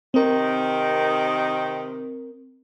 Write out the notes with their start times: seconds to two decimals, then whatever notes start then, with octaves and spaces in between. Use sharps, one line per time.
0.14 C3 D#3 C4 A#4